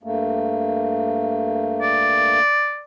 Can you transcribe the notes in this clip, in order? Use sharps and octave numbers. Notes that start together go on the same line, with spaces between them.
G2 A3 A#3
D5